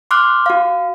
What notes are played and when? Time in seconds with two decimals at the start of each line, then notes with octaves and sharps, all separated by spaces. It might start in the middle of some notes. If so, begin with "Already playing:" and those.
0.11 C6 D6 F6 F#6
0.46 F#4 F5